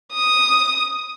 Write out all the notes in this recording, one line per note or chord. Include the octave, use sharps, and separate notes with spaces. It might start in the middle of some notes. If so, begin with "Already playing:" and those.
D#6